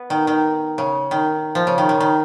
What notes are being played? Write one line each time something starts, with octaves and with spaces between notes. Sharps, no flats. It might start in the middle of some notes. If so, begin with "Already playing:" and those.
Already playing: B3
D#3
D#3
C#3
D#3
F3
C#3
D#3
C#3
D#3